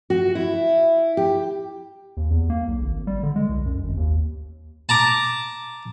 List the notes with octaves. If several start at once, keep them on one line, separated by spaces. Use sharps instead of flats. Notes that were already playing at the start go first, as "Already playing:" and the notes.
F#4
E4
G4
D#2
E2
A#3
B1
G#1
G3
D3
G#3
C2
F#2
G#1
D#2
A5 A#5 D6